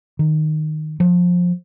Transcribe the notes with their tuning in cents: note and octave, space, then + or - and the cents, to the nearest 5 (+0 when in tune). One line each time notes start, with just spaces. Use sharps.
D#3 -10
F3 +20